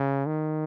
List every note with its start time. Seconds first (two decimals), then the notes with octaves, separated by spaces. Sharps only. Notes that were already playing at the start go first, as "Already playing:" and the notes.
Already playing: C#3
0.26 D#3